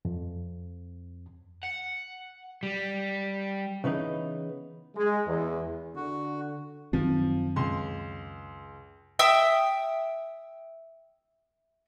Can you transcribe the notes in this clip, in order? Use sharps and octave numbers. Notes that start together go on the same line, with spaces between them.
F2
F#5
G3
C#3 E3 B3 D#4
G#3
E2
D3 F#4
F#2 D#3 F3 C4
C#2 C6
E5 G5 D#6 E6